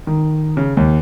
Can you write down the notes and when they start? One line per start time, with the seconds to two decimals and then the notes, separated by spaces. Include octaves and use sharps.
0.07 D#3
0.57 C#3
0.77 D#2